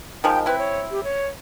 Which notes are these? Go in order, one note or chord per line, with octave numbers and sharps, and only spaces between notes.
D#3 F3 G#3 G5
C4 E4 B4
C#5
G4
C#5